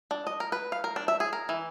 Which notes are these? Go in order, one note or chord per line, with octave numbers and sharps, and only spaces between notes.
D4
D#5
A#4
B4
F5
A#4
D4
E5
G#4
A#4
E3